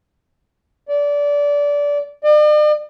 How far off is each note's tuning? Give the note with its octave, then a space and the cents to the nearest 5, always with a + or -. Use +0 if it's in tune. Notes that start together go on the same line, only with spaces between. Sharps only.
D5 -20
D5 +45